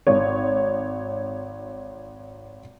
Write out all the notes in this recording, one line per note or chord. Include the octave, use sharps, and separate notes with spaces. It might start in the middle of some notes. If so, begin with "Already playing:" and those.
G#1 C#5